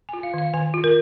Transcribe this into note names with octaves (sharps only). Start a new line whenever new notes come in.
F4 G#5
F5
D#3 F5
D#3 G#5
F4
A#4